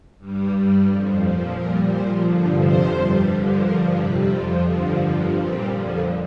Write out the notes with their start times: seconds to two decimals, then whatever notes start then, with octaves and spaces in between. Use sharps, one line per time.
0.18 G2 G3
0.52 G2 G3
0.86 F2 F3
1.21 A#2 F3
1.55 A#2 G3 A#4
1.89 A#2 F3 C5
2.24 G2 D3 F3
2.59 F2 C3 F3 C5
2.93 G2 G3
3.28 G2 D3 F3
3.62 G2 F3 A#4
3.96 F2 C3 G3 G4
4.30 F2 F3 F4
4.65 G2 D3 F3 C4
4.99 G2 F3 A#3
5.34 A#2 G3 C4
5.69 F2 D3 F3